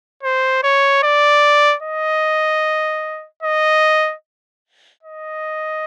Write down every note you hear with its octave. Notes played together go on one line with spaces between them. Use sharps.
C5
C#5
D5
D#5
D#5
D#5